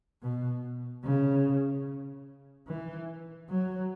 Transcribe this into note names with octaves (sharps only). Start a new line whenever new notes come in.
B2
C#3
E3
F#3